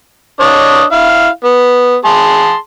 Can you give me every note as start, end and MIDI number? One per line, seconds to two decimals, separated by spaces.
0.40 0.83 62
0.40 0.83 73
0.40 0.83 75
0.92 1.28 64
0.92 1.28 77
1.44 1.96 59
2.05 2.56 68
2.05 2.56 81
2.05 2.56 84